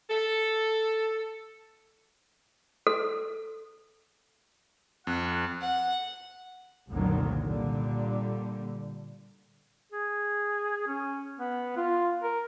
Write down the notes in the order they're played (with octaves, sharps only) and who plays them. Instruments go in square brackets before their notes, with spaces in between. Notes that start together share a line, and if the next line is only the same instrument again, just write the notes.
[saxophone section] A4
[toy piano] A4
[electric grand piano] F2 [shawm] F#5
[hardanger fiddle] F#5
[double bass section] F1 C2 A#2 D3 D#3 F#3
A#2 D3 G3
[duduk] G#4
C#4
B3
F4
A#4